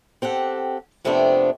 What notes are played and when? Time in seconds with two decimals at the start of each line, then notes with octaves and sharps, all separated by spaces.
0.22 C4 G4 A4 F#5
1.05 F2 C3 A3 B3 C4 D4